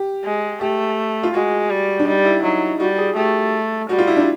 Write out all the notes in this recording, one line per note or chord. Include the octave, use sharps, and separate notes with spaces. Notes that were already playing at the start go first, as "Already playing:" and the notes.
Already playing: G4
G#3
A3 G4
F4
G#3 F#4
G3
D4
G3 D#4
E4
F#3 D#4
G3 F#4
G#4
A3 G4
G3 F#4
F4
E4
D4